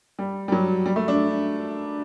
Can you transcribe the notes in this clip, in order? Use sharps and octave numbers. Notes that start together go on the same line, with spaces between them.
G3
G3
F#3
G3
A3
D4